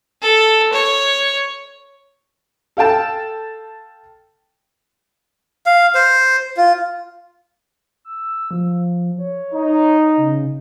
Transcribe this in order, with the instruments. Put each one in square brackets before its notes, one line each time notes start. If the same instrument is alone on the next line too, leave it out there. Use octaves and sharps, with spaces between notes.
[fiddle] A4
C#5
[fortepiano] A4 F5 G5 A5
[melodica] F5
C5
F4
[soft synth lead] E6
F3
C#5
[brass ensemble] D#4
[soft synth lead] C#3